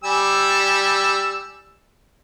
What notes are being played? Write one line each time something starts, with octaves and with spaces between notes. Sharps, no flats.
G3 G#5 E6